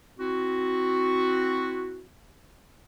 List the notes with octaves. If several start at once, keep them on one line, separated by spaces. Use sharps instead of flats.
C4 E4 F#4